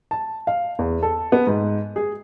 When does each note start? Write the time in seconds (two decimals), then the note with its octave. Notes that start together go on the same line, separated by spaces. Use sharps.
0.11 A5
0.47 F5
0.79 E2
1.03 A4
1.32 B3
1.47 G#2
1.96 G#4